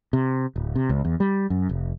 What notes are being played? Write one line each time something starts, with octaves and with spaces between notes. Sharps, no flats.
C3
D1
C3
C#2
E2
G3
F#2
F1